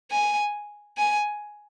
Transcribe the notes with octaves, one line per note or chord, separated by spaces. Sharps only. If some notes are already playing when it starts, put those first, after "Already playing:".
G#5
G#5